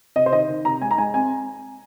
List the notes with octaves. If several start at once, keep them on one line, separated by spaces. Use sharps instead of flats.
C3 D#5
C5
D#3 D#5
D#3
C3 A#5
G#3 G#5
A#5
G#3 G#5
C4 G#5